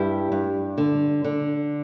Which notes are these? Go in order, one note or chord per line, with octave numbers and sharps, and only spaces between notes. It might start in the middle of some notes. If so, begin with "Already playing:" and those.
Already playing: G2 E4 G4
G2
D3
D3